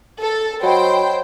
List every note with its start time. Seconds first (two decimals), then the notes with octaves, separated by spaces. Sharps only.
0.20 A4
0.63 F#3 C5 D#5 F#5 G5 B5